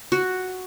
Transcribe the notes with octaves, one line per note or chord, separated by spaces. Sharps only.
F#4